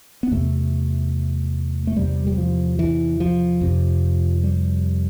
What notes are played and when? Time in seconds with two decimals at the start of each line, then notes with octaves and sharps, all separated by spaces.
0.23 B3
0.31 E2 C3 A3
1.87 A3
1.96 E2 C3 G3
2.27 G3
2.38 F3
2.79 E3
3.20 F3
3.61 F2 C3
4.44 G3